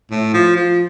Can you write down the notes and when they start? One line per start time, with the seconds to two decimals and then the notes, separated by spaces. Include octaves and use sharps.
0.11 A2
0.34 F3
0.56 F3